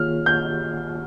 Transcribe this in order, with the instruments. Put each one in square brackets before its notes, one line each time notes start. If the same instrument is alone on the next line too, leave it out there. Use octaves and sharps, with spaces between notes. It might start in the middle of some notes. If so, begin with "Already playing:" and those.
Already playing: [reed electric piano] D#3 A#3 F4 G#4 C#5 [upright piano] F6
[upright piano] G6